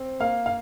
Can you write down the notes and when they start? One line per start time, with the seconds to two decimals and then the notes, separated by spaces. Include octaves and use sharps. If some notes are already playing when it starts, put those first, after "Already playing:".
Already playing: C4
0.20 A#3 F5
0.46 F5